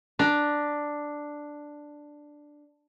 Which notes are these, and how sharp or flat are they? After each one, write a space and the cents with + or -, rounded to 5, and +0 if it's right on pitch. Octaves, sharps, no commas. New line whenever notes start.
D4 +5 A#5 +25